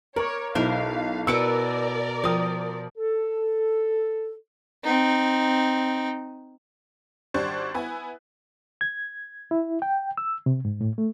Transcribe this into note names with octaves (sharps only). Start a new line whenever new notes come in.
A#4 C#5 D5 C#6
B1 E4 A#4 C5 F5
B2 A#4 B4 D5 D6 E6 C#7 D7
F3 F5 G5 D#6
A4
C4 D#4
G#1 G3 D4 C5 C#6 F#6
B3 E4 B4 G#5
G#6
E4
G5
E6
C3
G#2
A2
A3